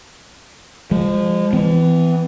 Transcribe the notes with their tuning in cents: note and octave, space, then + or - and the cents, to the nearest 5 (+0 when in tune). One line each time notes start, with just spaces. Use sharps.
F3 +0 G#3 -30
E3 +5 B3 +45